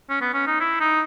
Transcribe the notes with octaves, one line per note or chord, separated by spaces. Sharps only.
C#4
B3
C#4
D#4
E4
D#4